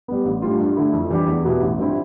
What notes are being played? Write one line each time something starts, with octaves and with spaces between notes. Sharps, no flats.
G3 B3
A1
A2 G3 D4 F4
G2
D3 A3 E4
F2
E3 G3 D4 G4
E2
B2 B3 E4 G4
A1
G2 F3 C4 E4